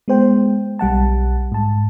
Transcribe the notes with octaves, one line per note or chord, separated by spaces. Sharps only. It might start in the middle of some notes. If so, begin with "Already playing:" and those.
G#3 B3 C5 G5
B1 G3 F#5 A5
G#2 A5